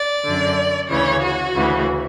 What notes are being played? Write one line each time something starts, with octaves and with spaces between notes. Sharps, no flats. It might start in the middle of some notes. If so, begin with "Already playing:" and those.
Already playing: D5
F#2 D3
D2 C#3 E3 C#5
F#4
D2 C#3 E3